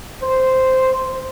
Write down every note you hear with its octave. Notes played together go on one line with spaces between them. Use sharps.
C5